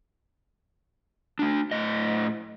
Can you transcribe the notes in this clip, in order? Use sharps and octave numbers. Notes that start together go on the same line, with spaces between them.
A3 D4
A2 D#5